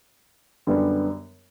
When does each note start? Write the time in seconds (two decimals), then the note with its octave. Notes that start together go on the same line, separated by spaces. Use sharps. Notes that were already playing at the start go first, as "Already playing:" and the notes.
0.67 F#2 D3 G3 B3